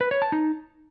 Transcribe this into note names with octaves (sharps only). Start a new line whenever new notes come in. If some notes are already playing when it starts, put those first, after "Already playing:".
B4
C#5
A5
D#4